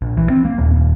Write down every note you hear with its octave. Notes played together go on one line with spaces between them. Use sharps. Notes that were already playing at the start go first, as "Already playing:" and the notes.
A#1
E3
C4
A#3
D#1
D#1